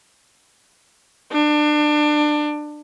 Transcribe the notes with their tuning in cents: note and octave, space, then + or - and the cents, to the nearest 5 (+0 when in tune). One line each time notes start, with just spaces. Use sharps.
D4 +25